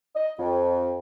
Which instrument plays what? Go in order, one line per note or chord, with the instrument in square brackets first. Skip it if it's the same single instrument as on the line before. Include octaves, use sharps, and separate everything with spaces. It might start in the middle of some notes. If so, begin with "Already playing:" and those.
[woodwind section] D#5
F2